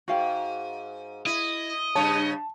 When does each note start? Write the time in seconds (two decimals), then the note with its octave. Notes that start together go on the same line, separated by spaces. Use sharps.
0.08 G#2 F#4 F5 G5
1.26 E4 D#5
1.95 G2 C#3 C#5 A5